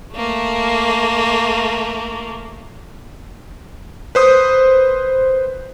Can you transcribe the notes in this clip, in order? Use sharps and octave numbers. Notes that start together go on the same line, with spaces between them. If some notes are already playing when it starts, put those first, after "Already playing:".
A3 A#3
B4 C5 D#6